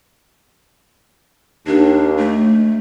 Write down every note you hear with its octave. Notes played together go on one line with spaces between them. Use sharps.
D#2 D4
A3